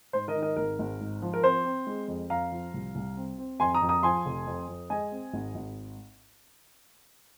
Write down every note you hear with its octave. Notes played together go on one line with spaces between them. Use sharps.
G#2 C5
A#4 D#5
D#3
A#4 D#5
G#1 A#4
G#1
G#2
F3
A#4
C4 C5
C4
G#3
F2
F2 F5 A#5
F3
C2
C2
C4
C4
F2 G#5 C6
A#5 D#6
F2
A#5 D#6
F3 G#5 C6
F1
F2
F2
G#3 D#5 G#5
C4
G#1
G#1